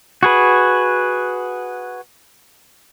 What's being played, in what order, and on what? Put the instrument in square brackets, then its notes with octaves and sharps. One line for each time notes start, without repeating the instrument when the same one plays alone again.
[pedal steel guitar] F#4 G#4 B4